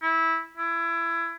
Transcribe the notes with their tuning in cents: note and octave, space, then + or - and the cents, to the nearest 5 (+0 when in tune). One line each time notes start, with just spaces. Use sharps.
E4 -15
E4 +25